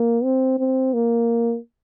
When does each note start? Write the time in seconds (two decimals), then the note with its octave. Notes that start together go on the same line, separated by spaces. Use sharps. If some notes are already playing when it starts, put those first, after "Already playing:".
Already playing: A#3
0.24 C4
0.59 C4
0.94 A#3